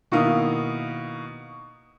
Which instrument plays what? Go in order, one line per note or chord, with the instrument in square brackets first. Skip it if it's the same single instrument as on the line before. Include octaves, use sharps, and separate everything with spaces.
[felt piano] B2 D#3 A#3 E4 F5 D#6